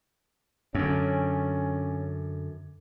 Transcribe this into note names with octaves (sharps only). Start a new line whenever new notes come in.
F#2 D3 C#4